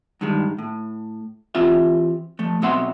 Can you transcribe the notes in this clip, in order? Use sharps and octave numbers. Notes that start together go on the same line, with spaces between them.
G2 D#3 G#3
A2
E3 C4 F4 G4 E5
F3 A3
B2 F#3 C4 E5 F#5 C6